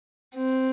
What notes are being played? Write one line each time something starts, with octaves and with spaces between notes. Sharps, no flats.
C4